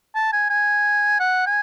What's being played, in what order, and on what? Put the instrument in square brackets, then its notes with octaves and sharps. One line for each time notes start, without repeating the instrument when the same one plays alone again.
[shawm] A5
G#5
G#5
F#5
G#5